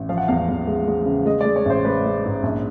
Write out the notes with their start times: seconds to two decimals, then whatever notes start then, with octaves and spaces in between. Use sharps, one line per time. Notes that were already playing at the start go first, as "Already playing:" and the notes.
Already playing: A1
0.09 F3 F5
0.17 F#5
0.28 E2 F5
0.48 E2
0.67 G#3
0.87 G#3
1.06 C#3
1.26 G#3 D#5
1.41 G#3 D5
1.56 C#5
1.65 A1 C5
1.85 G#3 B4
2.05 G#3
2.25 G#2
2.43 A#1